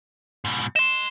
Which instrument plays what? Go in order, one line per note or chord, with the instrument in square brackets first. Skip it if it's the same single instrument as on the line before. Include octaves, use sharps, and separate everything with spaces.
[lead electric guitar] G#2 B2
[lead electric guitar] D#5 C6 [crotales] E7